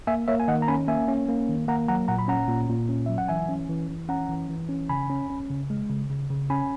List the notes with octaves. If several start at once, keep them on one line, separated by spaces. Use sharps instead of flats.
A#3 E5 G#5
A#3 C#5 E5
G#5
D#3 D#5 F#5
A#5
C#4 G#5 B5
A#3 E5 G#5
C#4
A#3
D#3
A#3 F#5 A#5
F#3 F#5 A#5
A#2 F#5 A#5
B5
C#4 F#5 A#5
A#2
A#2
C#4
F#3 E5
F#5
E3 E5 G#5
C#4
E3
E3
C#4 F#5 A#5
E3
E3
C#4
C#3 G#5 B5
C#4
C#4
C#3
G#3
C#3
C#3
C#3
C#4 G#5 B5